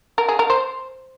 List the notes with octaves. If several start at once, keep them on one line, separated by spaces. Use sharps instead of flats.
A#4
G#4
A#4
C5